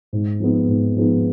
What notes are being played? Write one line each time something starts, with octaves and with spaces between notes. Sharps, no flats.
G#2
F3 G#3 B3 D#4
G#2
F3 G#3 B3 D#4